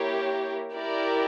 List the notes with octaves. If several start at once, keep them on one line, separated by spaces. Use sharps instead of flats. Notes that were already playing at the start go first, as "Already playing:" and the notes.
Already playing: A#3 E4 G4 A#4 C#5
E4 G4 A#4 D5